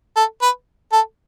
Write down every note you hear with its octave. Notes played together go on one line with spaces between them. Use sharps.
A4
B4
A4